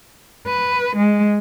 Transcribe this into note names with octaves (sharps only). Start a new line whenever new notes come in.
B4
G#3